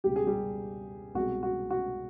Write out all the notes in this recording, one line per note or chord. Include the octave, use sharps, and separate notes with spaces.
C#2 B2 G3 G4
G#4
G3 G4
C2 B2 G#3 F#4
F#4
F#4